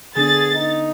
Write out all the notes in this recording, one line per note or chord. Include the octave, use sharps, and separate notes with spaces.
D3 B3 D4 G#4 A6
D#4